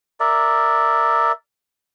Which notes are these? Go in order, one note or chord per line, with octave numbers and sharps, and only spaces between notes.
A#4 D5 E5